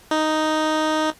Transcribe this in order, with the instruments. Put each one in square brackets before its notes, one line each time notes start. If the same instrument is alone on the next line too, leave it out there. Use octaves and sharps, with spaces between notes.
[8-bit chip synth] D#4